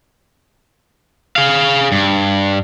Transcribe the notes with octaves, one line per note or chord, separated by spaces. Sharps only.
G#4 F5
G2